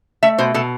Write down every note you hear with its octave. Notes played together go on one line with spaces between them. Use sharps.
A3 E5
B2 C5
B2 A4